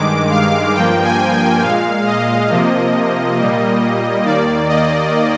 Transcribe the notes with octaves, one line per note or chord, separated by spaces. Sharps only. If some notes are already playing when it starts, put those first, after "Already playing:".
Already playing: G2 D#3 G#3 D6
F5
G2 F3 A#3 G5
G#5
G5
A#2 G#3 F5
D#5
C3 F3 A#3
A#2 G3 A#3
D#2 D#3 A#3 D5
D#5